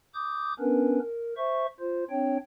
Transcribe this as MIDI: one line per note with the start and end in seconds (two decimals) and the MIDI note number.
0.15 0.54 86
0.15 0.54 87
0.15 0.54 91
0.59 0.99 59
0.59 0.99 61
0.59 0.99 62
0.59 0.99 70
0.59 0.99 71
1.01 1.34 70
1.37 1.67 72
1.37 1.67 76
1.37 1.67 85
1.80 2.04 65
1.80 2.04 72
2.10 2.37 60
2.10 2.37 62
2.10 2.37 73
2.10 2.37 79